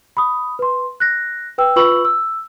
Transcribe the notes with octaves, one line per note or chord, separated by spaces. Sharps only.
B5 D#6
B4 C6
F#6 A#6
B4 G5 E6
F4 B4 B5 C#6 E6 F#7
E6